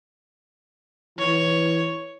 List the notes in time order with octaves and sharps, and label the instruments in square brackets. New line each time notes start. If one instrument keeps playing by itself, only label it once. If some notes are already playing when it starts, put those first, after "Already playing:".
[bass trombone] E3 [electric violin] C#5